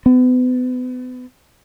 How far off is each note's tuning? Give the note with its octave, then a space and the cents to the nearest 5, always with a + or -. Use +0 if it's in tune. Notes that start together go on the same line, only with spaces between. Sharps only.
B3 +35